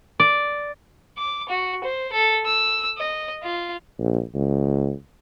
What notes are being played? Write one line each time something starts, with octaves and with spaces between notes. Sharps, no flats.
D5
D6
F#4
C5
A4
E6
D#5
F4
A#1
C#2